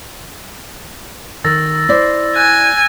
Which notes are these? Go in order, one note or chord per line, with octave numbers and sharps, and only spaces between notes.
D#3 E6 A6 A#6
E4 C5 D5
G#5 F#6 G6